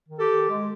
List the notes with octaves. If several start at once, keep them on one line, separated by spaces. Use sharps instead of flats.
D#3
G4 A4
D#3
G#3